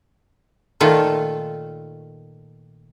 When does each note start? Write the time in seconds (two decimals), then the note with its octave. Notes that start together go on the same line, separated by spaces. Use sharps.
0.80 A#2 D#3 A3 F4